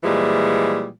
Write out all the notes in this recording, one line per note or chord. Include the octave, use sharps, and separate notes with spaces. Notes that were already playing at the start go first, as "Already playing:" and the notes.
A#2 E3 F3 G3 G#3